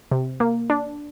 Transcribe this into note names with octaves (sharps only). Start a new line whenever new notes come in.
C3
A#3
D4